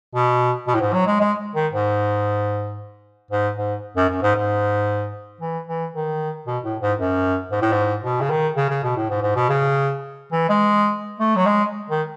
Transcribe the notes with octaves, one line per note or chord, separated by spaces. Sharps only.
B2
B2
A2
G#2
F#3
G#3
G#3
D#3
G#2
G#2
G#2
F#2
F#2
G#2
G#2
E3
E3
D#3
B2
A2
G#2
F#2
G#2
A2
G#2
B2
C#3
D#3
C#3
C#3
B2
A2
G#2
G#2
B2
C#3
E3
G#3
A3
F#3
G#3
D#3